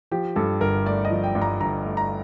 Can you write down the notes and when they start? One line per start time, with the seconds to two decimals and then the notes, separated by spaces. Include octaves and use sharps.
0.11 F3 G4
0.36 G2 A4
0.61 G1 A#4
0.86 A3 D5
1.05 D#5
1.11 F3
1.24 G5
1.35 G2
1.42 A#5
1.61 G1 A#5
1.85 A3
1.97 A#5